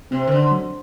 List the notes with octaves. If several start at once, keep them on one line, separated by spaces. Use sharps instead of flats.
C3 C4
D#3
D3
F#3